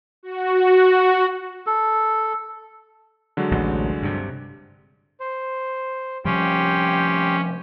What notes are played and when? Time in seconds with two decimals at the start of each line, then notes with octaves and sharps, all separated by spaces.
0.23 F#4
1.67 A4
3.37 D3 F#3 G#3
3.51 A1 D2 C3
4.03 G2 C3
5.20 C5
6.25 C3 F3 G3 C#4 G4 G5 C6